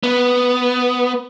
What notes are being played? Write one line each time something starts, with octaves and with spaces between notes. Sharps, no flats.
B3